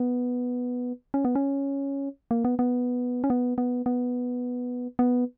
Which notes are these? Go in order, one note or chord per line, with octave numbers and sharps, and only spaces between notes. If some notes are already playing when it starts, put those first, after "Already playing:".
Already playing: B3
C#4
B3
C#4
A#3
B3
B3
C#4
B3
B3
B3
B3